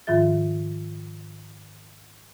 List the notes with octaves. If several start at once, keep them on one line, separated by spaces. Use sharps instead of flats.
G#2 D#3 F3 F4 E5 A6